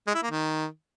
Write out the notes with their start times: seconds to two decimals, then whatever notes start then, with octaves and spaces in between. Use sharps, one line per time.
0.07 G#3
0.15 E4
0.23 A#3
0.30 D#3